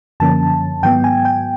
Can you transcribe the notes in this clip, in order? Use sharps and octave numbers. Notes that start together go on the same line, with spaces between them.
F#2 D3 F3 A#3 C#4 A5
G#2 D#3 F#3 B3 G5
G#5
G5